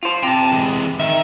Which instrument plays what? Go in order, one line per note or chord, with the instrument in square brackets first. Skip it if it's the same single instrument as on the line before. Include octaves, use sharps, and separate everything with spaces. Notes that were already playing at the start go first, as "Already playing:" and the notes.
[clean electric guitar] F4 C5
[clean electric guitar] C3 [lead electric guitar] G5 A5
[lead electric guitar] E3 G#3
[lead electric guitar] D#3 [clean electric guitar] E5